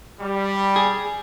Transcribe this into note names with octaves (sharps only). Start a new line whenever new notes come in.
G3
G#4